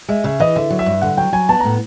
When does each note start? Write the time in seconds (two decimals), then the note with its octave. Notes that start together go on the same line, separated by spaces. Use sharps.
0.09 G#3 E5
0.24 C#3 E5
0.40 E3 D#5
0.56 D3 E5
0.70 F#3
0.79 E5
0.86 G2
1.02 D3 F#5
1.17 F#3 G5
1.33 F#3 G#5
1.49 B3 A5
1.60 A2 A#5